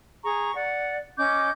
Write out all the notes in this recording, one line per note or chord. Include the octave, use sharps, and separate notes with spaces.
G#4 A#5 C#6
D5 F#5
C#4 D#5 D6 G6